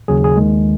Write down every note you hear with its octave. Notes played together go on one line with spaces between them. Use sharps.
D#2 C#3 F#3 G#4
G#4
D#2 D#3 G#3